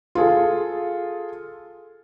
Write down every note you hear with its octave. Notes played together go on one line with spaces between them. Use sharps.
F4 G#4 A4